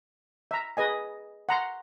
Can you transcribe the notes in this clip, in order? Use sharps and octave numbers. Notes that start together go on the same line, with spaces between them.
E5 A#5
G#4 B4 D#5 G#5
F#5 A#5 C6